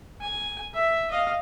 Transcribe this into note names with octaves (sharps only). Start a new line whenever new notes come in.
G#5
E5
D#5 F5